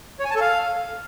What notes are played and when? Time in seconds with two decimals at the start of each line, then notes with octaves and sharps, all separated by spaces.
0.20 C#5
0.25 G#5
0.30 A5
0.36 A4
0.41 F5